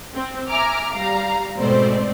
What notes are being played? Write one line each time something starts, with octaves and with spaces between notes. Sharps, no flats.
C4
E5 G#5 A#5 D6 F6
G3 F5 A#5
G#2 B2 A3 C4 C5 D5